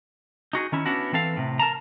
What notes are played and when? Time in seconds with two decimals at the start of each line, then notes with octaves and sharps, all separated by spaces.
0.53 D#4 F#4 G#4
0.72 D#3 C#4 E4
0.86 B3 C#4 D4 E4 F#4
1.12 E3 C4 A4 F5
1.36 A2 C3
1.59 A#4 A5 A#5